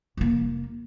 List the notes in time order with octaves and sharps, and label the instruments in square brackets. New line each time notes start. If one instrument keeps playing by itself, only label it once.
[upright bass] F1 A#3